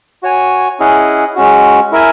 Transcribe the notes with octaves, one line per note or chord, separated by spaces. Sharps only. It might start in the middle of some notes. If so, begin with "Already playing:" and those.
F#4 C#5 G#5
C#4 E4 G#4 D#5 F#5
G#3 C#4 F#4
E4 A#4 E5 G#5